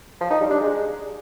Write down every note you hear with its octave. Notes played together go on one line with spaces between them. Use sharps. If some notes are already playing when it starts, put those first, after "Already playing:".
F3
D#4
G3
D4
G#3